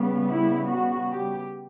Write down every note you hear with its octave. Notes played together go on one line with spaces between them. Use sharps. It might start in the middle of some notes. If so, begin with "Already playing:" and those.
Already playing: C#3 G3 B3
E4
F#4
G4